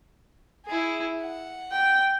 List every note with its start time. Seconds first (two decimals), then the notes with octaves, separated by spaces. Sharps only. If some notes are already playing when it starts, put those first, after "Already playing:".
0.66 E4 G#4
1.21 F#5
1.72 G5